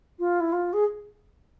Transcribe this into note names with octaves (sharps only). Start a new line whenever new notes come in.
F4
E4
F4
G#4